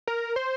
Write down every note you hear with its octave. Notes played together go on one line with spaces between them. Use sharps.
A#4
C5